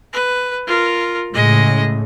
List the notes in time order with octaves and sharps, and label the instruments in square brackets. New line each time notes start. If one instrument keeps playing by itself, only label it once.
[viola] B4
F4 A#4
[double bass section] A2 C#3 [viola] G#3 D#5